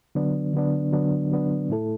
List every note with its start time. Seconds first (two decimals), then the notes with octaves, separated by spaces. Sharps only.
0.15 D3 F#3 B3 D4
0.54 D3 F#3 B3 D4
0.92 D3 F#3 B3 D4
1.31 D3 F#3 B3 D4
1.69 A2 A3 E4 A4